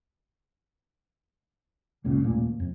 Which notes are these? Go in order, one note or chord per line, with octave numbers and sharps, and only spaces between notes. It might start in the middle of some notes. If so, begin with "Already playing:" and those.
F#1 C#2 A#2 C#3
D#1 A#2 A3 A#3
F2